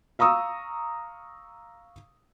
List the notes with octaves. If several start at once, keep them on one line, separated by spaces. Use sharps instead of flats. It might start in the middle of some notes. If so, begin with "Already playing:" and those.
F5 A#5 C#6 D#6 E6